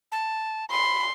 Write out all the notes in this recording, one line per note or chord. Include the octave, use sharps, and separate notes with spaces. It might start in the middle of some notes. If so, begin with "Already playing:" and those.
A5
B5 C6